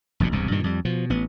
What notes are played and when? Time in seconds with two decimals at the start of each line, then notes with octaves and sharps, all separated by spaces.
0.20 F1 A#1 G2 A#2
0.32 E1 C2 G2 C3
0.51 G2 A#2 D#3
0.64 F2 G3
0.85 B2 F3
1.10 A1 B3